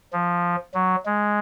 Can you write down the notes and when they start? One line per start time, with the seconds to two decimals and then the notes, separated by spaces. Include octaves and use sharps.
0.13 F3
0.74 F#3
1.06 G#3